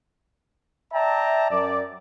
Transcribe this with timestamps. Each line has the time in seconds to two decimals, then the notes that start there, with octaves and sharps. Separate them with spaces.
0.93 D5 E5 G5 A5 A#5
1.50 F#2 D5